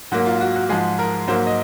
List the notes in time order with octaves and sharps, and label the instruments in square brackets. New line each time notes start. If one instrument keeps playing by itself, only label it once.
[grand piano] G#2 F#3 A#3 F#4
F4
F#4
F#4
G#2 F3 G#3 G#4
A#4
G#2 F#3 A#3 C5
D#5